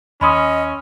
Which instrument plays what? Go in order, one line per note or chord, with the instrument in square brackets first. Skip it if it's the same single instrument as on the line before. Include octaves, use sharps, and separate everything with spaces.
[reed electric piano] D#2 E6 [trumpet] C#4 [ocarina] D#5 [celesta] B5 C6 D#6